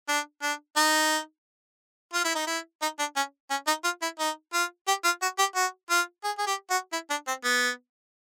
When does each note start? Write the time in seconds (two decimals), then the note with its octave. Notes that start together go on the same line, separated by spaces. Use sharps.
0.09 D4
0.42 D4
0.77 D#4
2.14 F4
2.25 E4
2.35 D#4
2.47 E4
2.82 D#4
2.99 D4
3.17 C#4
3.50 C#4
3.67 D#4
3.84 F4
4.02 E4
4.20 D#4
4.53 F4
4.88 G4
5.05 F4
5.22 F#4
5.39 G4
5.55 F#4
5.90 F4
6.24 G#4
6.38 G#4
6.47 G4
6.70 F#4
6.93 E4
7.10 D4
7.28 C4
7.44 B3